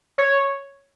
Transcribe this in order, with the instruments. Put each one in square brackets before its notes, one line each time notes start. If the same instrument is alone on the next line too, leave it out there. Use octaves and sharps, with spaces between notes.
[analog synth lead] C#5